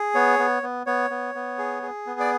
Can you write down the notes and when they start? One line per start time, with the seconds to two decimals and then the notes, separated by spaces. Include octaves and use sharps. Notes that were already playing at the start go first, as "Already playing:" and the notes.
Already playing: G#4
0.15 B3 C#5
0.39 B3
0.63 B3
0.86 B3 C#5
1.10 B3
1.35 B3
1.59 G#4
1.83 G#4
2.07 B3
2.20 D5